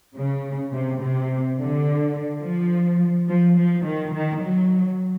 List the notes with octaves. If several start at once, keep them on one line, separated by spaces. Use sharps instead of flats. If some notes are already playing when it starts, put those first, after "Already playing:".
C#3
C3
C3
D3
F3
F3
F3
D#3
D#3
F#3